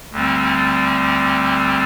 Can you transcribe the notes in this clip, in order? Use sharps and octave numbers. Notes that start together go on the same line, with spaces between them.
D2 D3 G3 C4